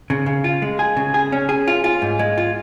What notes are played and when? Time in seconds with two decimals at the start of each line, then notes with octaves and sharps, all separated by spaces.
0.10 C#3
0.26 C#3
0.44 F4
0.62 G#3
0.79 G#4
0.97 C#3
1.14 G#4
1.32 C#4
1.49 G#4
1.68 F4
1.84 F4
2.02 G#2
2.19 G#3
2.38 F4